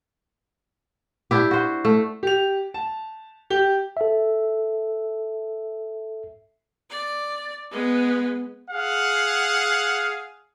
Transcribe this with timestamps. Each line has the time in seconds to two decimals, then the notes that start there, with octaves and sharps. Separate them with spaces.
1.31 D4 E4 G4
1.51 F#4 C5
1.85 A3
2.23 G4 F7
2.74 A5
3.50 G4 G7
3.97 A4 E5
6.90 D5
7.71 G#3 B3
8.71 G#4 F5 F#5